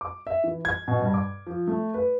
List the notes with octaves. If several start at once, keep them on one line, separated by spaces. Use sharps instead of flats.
D6
E5
E3
G#6
B2
G2
D6
F3
A3
B4